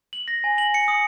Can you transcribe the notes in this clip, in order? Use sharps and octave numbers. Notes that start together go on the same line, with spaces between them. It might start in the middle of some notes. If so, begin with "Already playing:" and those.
F#7
A#6
G#5
F#7
C#7
D#6